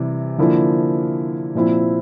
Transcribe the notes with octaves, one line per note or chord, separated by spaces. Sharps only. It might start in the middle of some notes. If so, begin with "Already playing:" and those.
Already playing: C3 E3 G3
D3 F3 A#3 E4
A#2 F3 C4 E4